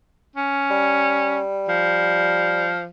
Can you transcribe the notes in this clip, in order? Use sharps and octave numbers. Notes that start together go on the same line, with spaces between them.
C#4
G3
F3